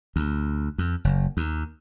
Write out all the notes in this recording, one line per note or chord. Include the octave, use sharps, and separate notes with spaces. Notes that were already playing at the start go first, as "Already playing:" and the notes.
D2
F2
F#1
D#2